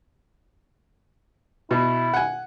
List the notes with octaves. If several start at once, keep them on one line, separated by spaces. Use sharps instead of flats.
B2 E4
F#5 G#5